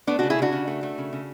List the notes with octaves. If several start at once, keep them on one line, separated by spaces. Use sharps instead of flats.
A3 B3 D4
C#3 D4 F#4
E4 G#4
C#3 D4 F#4
C#3
A3
A3
C#3
C#3